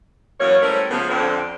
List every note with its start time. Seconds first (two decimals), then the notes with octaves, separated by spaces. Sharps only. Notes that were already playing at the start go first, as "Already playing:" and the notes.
0.40 F#2 E3 F#3 A#3 C#5
0.61 G3 A3 C#4 E4 A#4 C5
0.90 C#3 F3 A3 B3
1.09 F2 D3 C4